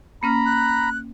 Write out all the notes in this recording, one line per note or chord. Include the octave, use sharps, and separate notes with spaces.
A#3 C#4 A#5 B5 F6
F#6